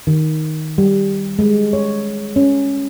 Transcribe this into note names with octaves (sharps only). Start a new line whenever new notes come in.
D#3
G3
G#3
C#5
C#4